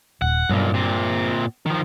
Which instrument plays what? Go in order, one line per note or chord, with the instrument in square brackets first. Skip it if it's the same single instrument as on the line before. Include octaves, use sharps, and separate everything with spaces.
[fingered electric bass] D#1 [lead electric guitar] F#5
[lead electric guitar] B1 A#2 [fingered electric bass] G2
[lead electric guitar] A#2 C4
D#3 F3